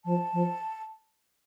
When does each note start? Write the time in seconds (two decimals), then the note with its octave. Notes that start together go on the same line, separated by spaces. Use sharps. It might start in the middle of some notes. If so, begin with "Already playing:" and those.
0.05 F3 A5
0.33 F3